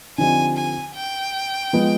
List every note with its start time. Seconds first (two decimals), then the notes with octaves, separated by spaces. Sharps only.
0.18 D3 F3 C4 D#4 G4 G#5
0.57 G#5
0.95 G5
1.73 F3 G#3 B3